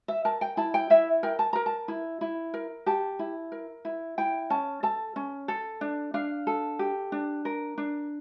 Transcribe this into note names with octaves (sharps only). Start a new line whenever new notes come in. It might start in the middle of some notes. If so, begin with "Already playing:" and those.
E5
A#4 A5
G5
E4 A5
G5
E4 E5
A#4 G5
A5
A#4 A#5
A5
E4
E4
A#4
G4 A5
E4
A#4
E4
E4 G5
C#4 A5
A4 A5
C#4
A4
D4
D4 F5
A4
G4
D4
A#4
D4